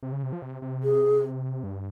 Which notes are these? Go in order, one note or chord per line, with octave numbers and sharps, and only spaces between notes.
C3
C#3
C3
F3
C3
C3
G#4
G2